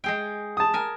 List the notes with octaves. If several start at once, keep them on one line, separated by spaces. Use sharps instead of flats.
G#3 G#4 G5
A5 D#6
A#4 G#5